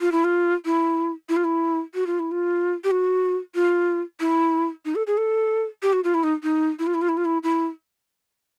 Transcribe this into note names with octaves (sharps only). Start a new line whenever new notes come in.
F4
E4
F4
E4
E4
F4
E4
F#4
F4
E4
F4
G4
F#4
F4
E4
D#4
A4
G#4
A4
G4
F#4
F4
E4
D#4
D#4
E4
F4
E4
F4
E4
F4
E4
E4